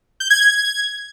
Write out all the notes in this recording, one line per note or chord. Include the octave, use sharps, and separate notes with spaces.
G6
G#6
G#6